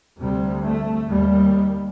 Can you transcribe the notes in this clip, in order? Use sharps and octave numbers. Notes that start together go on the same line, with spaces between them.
D2 C3 G3
A3
D#2 G3